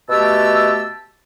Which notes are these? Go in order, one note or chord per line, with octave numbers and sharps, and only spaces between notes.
B2 A3 G4 A5 E6